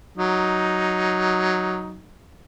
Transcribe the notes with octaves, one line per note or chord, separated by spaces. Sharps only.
F#3 D#4